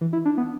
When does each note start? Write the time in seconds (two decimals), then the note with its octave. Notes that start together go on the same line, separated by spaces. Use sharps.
0.01 E3
0.13 E4
0.25 D4
0.37 B3